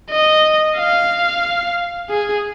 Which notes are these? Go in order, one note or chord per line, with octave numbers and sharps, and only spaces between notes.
D#5
F5
G#4